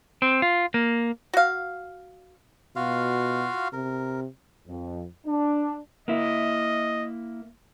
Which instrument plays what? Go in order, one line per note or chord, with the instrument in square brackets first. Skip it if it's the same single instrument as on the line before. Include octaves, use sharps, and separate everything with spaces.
[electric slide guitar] C4
F4
A#3
[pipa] F#4 F5
[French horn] B2 [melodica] F4 F#4 F5
[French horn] C3 [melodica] A#4
[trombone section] F2
D4
[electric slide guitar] A#3 E4 [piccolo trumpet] D#5